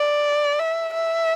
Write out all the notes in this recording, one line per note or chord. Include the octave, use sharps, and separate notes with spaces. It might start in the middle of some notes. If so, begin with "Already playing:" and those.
Already playing: D5
E5
E5